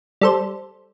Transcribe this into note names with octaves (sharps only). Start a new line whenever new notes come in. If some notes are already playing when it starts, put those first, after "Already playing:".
G3 A4 C5